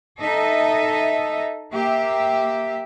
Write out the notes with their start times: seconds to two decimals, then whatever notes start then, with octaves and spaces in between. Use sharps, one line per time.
0.20 D#4 A4 D#5 E5
1.72 A#3 G4 E5